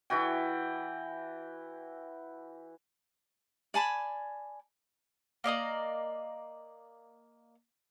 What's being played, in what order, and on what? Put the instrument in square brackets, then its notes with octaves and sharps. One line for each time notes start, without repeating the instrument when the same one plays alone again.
[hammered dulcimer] E3 E4 F#4 G5
[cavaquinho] D5 G#5 A5 B5
[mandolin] A#3 D5 D#5 A#5